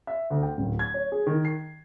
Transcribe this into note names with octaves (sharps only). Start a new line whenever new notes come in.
E5
D2
G5
D1
G#6
C#5
G#4
D#3
C7